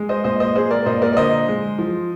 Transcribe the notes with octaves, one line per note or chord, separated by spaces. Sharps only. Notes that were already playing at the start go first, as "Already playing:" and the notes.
Already playing: G#3
C5 D#5
A#2 C5 D#5
C5 D#5
G#3 G#4 C5
A#4 D5
A#2 C5 D#5
A#4 D5
D5
D3 C5 D#5
G#3
F3